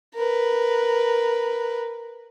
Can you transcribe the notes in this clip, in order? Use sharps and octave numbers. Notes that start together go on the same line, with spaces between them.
A#4 B4